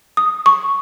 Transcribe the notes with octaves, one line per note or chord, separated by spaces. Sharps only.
D#6
C#6